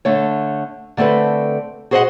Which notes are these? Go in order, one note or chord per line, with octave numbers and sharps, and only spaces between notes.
D3 A3 C#5
D3 A3 C4 A4 B4
F#4 G#4 C5 D5 D#5 F#5